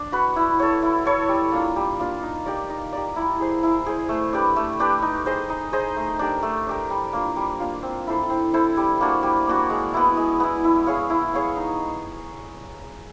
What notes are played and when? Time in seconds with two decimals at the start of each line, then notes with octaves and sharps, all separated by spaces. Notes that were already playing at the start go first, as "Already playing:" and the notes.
Already playing: D4
0.12 F#4 B4
0.36 E4
0.60 A4 C#5
0.83 E4
1.05 A4 C#5
1.29 G3
1.52 A#3 D4 F4
1.76 G3
1.99 A#3 D4 F4
2.23 D#4
2.46 G4 A#4 D5
2.70 D#4
2.92 G4 A#4 D5
3.16 E4
3.40 G#4 C5
3.63 E4
3.86 G#4 C5
4.09 A3
4.33 D4 G4 B4
4.56 A3
4.80 D4 G4 B4
5.02 D#4
5.26 G#4 C5 D#5
5.50 D#4
5.73 G#4 C5 D#5
5.96 A3
6.19 D4 G4 A#4
6.42 A3
6.67 D4 G4 A#4
6.90 G3
7.13 A#3 D4 F4
7.36 G3
7.60 A#3 D4 F4
7.83 C4
8.07 E4 A4 C5
8.30 C4
8.54 E4 A4 C5
8.77 G3
9.01 A#3 D4 F#4
9.23 G3
9.47 A#3 D4 F#4
9.70 G#3
9.94 B3 E4
10.17 G#3
10.40 B3 E4
10.64 E4
10.86 G#4 C#5 F5
11.10 E4
11.34 G#4 C#5 F5
11.57 D#4